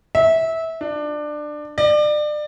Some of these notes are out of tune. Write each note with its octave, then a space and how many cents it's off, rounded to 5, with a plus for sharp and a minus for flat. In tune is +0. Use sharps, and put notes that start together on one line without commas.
E5 -20
D4 +20
D5 +30